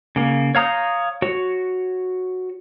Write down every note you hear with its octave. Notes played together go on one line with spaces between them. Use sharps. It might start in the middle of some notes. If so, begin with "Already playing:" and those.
C#3 A#3
C#5 F5 A#5 D#6 G6
F#4 C#5